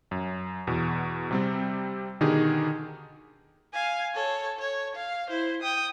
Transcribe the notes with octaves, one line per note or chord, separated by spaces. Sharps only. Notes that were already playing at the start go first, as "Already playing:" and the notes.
F#2
E2 B2
C3 G3 C4
B2 D3 D#3 D#4 G4 G#4
F5 G#5
A4 C#5
C#5
F5
E4 C5
G5 D#6